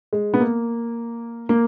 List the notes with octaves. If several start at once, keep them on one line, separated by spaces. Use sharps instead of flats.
G#3
B3
A#3
A#3